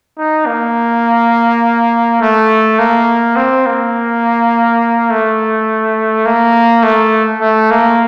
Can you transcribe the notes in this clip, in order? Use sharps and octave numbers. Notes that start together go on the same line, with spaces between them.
D#4
A#3
A3
A#3
C4
A#3
A3
A#3
A3
A3
A#3